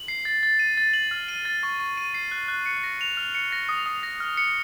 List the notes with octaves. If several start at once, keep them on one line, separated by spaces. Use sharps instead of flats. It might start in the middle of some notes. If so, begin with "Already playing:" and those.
Already playing: F#7
C7
A6
A6
D#7
A6
F#7
F6
D#7
A6
C#6
C#6
D#7
C7
F#6
F#6
C#7
A#6
F7
F6
C#7
A#6
D#6
D#6
A#6
F6
C#7